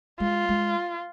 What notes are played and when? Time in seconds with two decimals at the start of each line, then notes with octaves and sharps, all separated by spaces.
0.20 G#3 F4
0.49 G#3